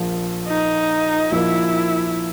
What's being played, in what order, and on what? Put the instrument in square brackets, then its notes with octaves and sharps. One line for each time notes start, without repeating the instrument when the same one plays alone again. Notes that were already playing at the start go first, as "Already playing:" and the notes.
Already playing: [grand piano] A#1 A#2 F3
[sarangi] D#4
[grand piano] A#1 A#2 F3 A#3 [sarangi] E4